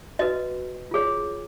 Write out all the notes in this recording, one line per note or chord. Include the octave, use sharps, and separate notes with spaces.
F#4 B4 D#5
F4 G#4 C#5